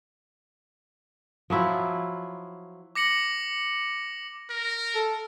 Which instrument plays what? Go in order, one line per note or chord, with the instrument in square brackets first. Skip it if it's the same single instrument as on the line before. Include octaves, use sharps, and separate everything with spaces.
[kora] F3 F#3 E4 F4
[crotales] D6 A#6 C#7 F#7
[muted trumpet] A#4
[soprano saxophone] A4